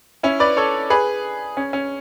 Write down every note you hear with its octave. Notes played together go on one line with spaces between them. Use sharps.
C#4 E4
B4 D5
A4 C#5
G#4 B4
C#4
C#4